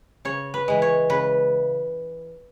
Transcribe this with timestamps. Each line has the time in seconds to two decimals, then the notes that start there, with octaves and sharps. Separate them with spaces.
0.25 C#3 C#5
0.54 B4
0.68 E3 G#3
0.82 C#5
1.09 C#3 B4